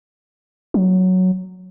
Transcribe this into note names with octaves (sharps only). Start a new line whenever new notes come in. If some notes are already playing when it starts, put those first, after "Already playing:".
F#3